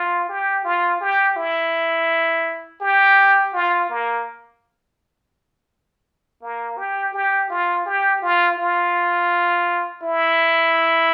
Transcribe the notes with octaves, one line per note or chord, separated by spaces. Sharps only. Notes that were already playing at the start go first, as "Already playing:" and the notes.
Already playing: F4
G4
F4
G4
E4
G4
F4
A#3
A#3
G4
G4
F4
G4
F4
F4
E4